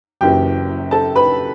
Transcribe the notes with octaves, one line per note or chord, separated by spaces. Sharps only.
F#1 F#2 E3 G4 G5
A4 A5
B4 B5